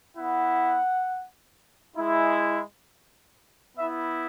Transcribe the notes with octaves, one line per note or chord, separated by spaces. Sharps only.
B3 E4 F#5
G#3 E4
B3 E4 E5